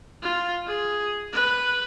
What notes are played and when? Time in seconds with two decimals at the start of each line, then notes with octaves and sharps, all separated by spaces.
0.22 F4
0.67 G#4
1.33 B4